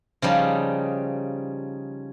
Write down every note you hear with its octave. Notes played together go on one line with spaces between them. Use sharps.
C#3 F3 G3 D#4